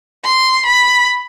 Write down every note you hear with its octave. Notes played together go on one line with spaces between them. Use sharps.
C6
B5